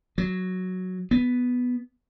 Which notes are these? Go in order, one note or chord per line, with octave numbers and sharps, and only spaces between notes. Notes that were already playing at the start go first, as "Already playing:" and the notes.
F#3
B3